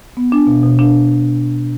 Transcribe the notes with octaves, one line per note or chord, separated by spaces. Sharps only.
B3
D4
B2
B2
D4